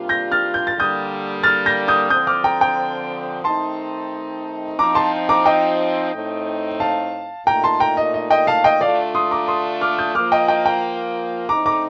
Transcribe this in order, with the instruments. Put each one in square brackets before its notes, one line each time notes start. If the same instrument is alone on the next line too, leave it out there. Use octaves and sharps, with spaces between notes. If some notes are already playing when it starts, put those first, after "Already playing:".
Already playing: [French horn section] C3 G3 A#3 D4 F4
[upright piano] G6 A#6
F6 A6
G6
A6
[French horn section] D3 G3 A#3 [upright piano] D#6 G6
[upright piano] F6 A6
G6 A#6
D#6 G6
[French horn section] D3 F3 C4 [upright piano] D#6 G6
[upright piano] D6 F6
G5 A#5
G5 A#5
[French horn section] D#3 A3 C4 D#4 [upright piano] A5 C6
[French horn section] F3 C4 D#4 [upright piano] A#5 D6
[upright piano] A5 C6
A#5 D6
D#5 G5
[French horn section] A2 A3 C4 D#4
[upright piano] F5 A5
[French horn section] A#2 A3 D#4 [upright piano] G5 A#5
[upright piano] A5 C6
G5 A#5
D#5
D#5
D#5 G5
F5 A5
D#5 G5
[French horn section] D3 A3 D4 F4 [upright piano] D5 F5
[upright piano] C6 D#6
A#5 D6
C6 D#6
D6 F6
D#6 G6
[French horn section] F3 A#3 F4 [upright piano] D6 F6
[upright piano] D#5 G5
D#5 G5
G5 A#5
[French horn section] D3 A3 C4 D#4 [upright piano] A#5 D6
[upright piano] A#5 D6